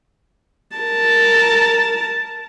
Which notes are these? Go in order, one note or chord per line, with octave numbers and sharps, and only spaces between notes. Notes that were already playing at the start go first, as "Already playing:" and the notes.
A#4 A5